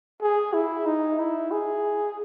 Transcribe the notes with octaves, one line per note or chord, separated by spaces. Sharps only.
G#4
E4
D#4
E4
G#4